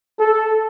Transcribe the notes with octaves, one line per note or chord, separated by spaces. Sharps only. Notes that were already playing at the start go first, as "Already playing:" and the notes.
A4